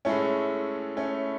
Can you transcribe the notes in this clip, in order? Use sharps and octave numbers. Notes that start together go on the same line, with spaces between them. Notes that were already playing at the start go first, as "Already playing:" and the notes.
A2 G#3 A3 C#4
A3 C#4